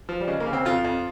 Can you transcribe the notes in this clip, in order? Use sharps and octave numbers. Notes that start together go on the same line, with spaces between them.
F3
G3
C#3 G#3
A#3
C#3
C4
F2 F4
F2